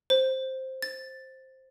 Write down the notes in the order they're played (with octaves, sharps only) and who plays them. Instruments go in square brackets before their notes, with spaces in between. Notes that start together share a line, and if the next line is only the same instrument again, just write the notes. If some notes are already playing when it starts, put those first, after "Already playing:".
[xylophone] C5
A6